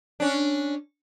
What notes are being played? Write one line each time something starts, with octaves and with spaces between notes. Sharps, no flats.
C#4 D4